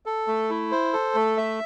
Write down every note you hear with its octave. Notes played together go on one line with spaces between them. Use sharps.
A4
A3
E4
C5
A4
A3
E5